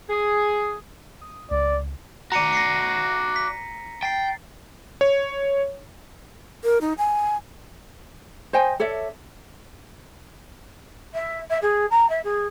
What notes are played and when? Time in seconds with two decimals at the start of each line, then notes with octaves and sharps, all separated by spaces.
0.10 G#4
1.21 D#6
1.51 C#2 D5
2.32 F#4 D5 A#5 C#7 D#7
2.53 A#6 C7 C#7
3.36 B6
4.03 G5 A6 C7
5.01 C#5
6.64 A#4
6.81 D#4
6.98 G#5
8.53 C5 D#5 G5 G#5
8.80 A4 C#5 D5 E5
11.14 E5
11.50 E5
11.62 G#4
11.90 A#5
12.09 E5
12.24 G#4